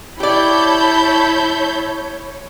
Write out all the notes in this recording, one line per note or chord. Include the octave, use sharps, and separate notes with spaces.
E4 G4 C#5 D5 A5 B5 G6